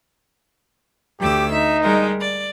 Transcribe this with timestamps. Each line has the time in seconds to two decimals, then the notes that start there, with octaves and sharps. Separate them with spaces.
1.21 D2 G4 D6 E6
1.51 D#4 E5
1.84 G3 G#3 A#4
2.19 D5